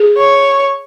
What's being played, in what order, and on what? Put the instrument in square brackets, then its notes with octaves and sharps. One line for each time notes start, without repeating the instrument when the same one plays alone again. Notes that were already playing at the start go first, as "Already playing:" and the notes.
Already playing: [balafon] G#4
[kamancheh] C#5